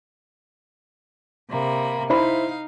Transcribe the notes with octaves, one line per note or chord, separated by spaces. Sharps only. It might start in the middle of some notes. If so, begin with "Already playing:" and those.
C3 A#3 B5
D#4 E4 C5 F5 B5